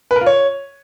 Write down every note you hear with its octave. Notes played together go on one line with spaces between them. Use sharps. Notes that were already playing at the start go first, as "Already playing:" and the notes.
B4
A#4
F4
C#5